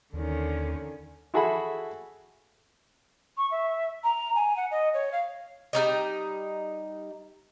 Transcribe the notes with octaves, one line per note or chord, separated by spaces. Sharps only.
D#2 D3 D#3 C#4
E4 F#4 G#4 A4 E5 B5
C#6
E5
A#5
G#5
F#5
D#5
C#5
F5
G3 C#4 D#4 D#5